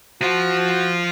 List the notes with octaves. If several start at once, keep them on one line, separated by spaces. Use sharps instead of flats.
F3 F4 F#4